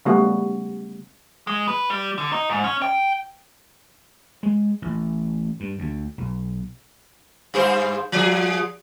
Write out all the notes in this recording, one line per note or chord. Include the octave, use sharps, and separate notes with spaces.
C#3 G3 A3 B3 F#4
G#3
B4
G3
D3
D#4
G#2
C#4
G5
G#3
A1
G2
D2
B1
G2 G#4 C5
F3 G#4